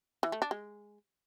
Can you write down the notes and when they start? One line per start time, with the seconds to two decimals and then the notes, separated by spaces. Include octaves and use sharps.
0.23 E3
0.32 A3
0.42 D4
0.51 G#3